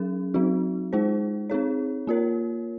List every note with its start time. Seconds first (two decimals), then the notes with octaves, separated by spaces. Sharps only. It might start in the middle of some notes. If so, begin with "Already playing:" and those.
Already playing: F#3 C#4 G#4
0.34 F#3 C4 D#4 F#4
0.93 G#3 D#4 G#4 C5
1.50 C4 D#4 G#4 C#5
2.07 A#3 F4 A#4 C#5